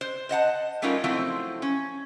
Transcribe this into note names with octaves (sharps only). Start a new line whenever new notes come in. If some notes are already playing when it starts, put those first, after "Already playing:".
C5
C5 D#5 F#5 A5
G3 A3 C#4 D#4 F4 A#4
F3 F#3 A3 C4 E4
C#4